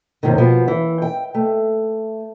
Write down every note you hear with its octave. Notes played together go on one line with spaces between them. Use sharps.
D#2 G#2 C3 D#3
B2 F3 A#3 B3
E3
G5
A3